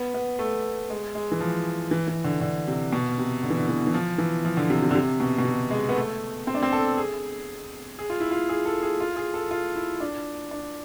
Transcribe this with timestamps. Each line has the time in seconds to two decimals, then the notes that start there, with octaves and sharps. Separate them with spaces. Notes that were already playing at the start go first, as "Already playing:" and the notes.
Already playing: B3
0.14 B3
0.39 A3
0.90 G#3
1.15 G#3
1.32 E3
1.41 F3
1.91 E3
2.08 E3
2.24 D3
2.41 D3
2.68 C3
2.93 B2
3.18 C3
3.43 D3
3.50 E3
3.57 D3
3.69 E3
3.87 E3
3.94 F3
4.18 E3
4.45 F3
4.57 D3
4.70 C3
4.82 C3
4.91 D3
4.95 C3
5.20 B2
5.39 B2
5.45 C3
5.71 G#3
5.89 B3
5.96 A3
6.47 C4
6.55 D4
6.63 C4
6.73 A4
6.97 G#4
7.99 G#4
8.10 F4
8.20 E4
8.31 F4
8.49 G#4
8.66 A4
8.83 G#4
9.00 F4
9.16 G#4
9.34 A4
9.51 F4
9.75 E4
10.00 D4
10.51 D4